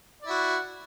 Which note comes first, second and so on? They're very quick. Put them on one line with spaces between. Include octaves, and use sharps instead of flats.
D5 E4 F#4